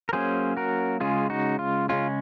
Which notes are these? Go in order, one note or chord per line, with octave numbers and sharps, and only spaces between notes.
A#4
F#3 A#3 C#4 G#4 C5
F#4 A#4
C#3 G#3 C#4 F4 G#4
D#4 F#4
F4
C#3 G#3 C#4 F4